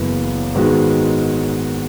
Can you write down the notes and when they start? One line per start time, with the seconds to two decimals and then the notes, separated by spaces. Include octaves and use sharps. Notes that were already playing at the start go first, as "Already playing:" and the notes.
Already playing: F#1 F#2 E3 B3
0.55 G#2 D#3 G#3 B3 F#4